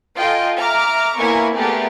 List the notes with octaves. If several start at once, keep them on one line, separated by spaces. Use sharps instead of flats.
F4 A4 D#5 G5 G#5
E5 A#5 D6 F6
A#3 B3 E4 C#5 G#5 C#6
A3 B3 G4 G#4 A#4 D5